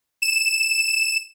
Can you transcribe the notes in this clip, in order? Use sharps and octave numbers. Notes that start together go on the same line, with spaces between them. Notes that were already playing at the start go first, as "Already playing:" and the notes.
E7